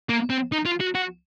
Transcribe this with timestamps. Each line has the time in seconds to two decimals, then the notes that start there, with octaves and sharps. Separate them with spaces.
0.09 A#3
0.30 C4
0.52 D#4
0.66 F4
0.81 F#4
0.95 F#4